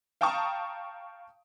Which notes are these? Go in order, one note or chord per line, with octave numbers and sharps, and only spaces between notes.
F5 G5 A5 A#5 C#6 D#6